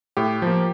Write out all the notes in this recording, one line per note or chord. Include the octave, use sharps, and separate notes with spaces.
A2 G4
F3 A#3